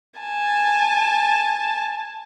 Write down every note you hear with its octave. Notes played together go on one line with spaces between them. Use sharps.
G#5 A5